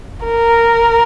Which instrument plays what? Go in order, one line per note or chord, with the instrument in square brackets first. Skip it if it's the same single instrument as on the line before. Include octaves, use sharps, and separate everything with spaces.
[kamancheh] A#4